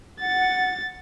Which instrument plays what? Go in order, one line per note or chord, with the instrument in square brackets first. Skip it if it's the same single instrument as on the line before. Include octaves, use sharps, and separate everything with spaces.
[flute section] F#5 [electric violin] A6